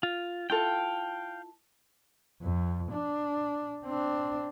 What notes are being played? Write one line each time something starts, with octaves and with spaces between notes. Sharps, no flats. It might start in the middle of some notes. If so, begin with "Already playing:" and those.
F4
E4 F4 A4 F5 G5
F2
D4
C4 D4